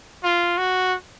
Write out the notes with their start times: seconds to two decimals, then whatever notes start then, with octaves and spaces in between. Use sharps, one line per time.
0.24 F4
0.58 F#4